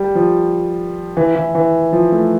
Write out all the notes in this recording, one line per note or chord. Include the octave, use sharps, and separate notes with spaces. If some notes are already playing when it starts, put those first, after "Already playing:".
Already playing: G3
F3
E3
E3
E3
F3
A3